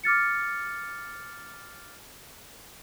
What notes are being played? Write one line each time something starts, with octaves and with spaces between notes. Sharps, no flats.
D6 F6 A6 C#7